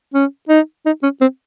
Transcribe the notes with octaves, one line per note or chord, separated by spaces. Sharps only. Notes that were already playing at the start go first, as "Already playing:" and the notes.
C#4
D#4
D#4
C#4
C4